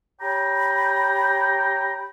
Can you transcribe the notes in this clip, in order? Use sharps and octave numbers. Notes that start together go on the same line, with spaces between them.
G4 C#5 G5 A#5 B5